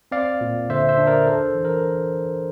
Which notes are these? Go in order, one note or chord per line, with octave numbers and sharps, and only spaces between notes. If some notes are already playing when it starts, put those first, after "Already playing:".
C4 D5 F5
A#2
D3 C5 E5
C5 E5
D4
A#4 D5
D4 A4 C5
A4
E3
A#4